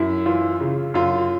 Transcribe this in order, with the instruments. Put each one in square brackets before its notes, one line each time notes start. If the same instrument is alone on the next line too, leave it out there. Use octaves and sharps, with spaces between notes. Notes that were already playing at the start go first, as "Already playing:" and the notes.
Already playing: [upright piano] F#2 E4
E3 F4
C#3
F#2 F4